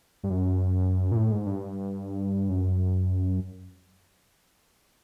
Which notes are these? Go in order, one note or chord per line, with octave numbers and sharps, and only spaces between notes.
G2
F#2
A#2
A2
G#2
G2
F#2